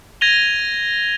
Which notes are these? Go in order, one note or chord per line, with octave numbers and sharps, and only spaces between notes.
G#6 A#6 D#7 F7 G7